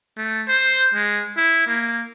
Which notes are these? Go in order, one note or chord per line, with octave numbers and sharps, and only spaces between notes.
A3
C5
G#3
E4
A#3